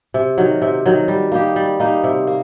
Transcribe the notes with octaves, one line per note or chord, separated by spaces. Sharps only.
C3
D#3 F#3
C3
D#3 F#3
G3
A#3 D#4 G4
G3
A#3 D#4 G4
C3
A#3